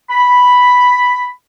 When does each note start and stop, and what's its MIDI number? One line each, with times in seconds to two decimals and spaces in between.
0.10 1.30 83